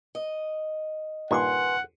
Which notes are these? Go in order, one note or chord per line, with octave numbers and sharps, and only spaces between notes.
D#5
G2 A#2 D#3 B4 F#5 G#5 C6